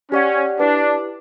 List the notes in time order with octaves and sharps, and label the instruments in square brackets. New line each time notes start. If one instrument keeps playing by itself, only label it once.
[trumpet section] C#4 [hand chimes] G4 D5 F#5
[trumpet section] D4 [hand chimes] E4 G4 B4